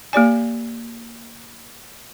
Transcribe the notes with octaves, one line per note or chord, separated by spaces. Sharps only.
A#3 G4 D5 G#5